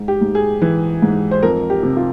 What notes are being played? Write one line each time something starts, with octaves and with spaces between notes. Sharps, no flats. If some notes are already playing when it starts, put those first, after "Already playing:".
Already playing: G#2
G4
G#2
G#4
E3
G#2
C5
F2 A#4
G4
C3
F4